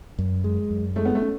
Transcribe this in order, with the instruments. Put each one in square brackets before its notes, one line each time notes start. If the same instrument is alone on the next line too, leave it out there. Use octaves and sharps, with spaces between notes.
[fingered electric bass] F#2
G#3
F#2
[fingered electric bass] G#3 [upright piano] A3
[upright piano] B3
A3
[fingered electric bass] C#4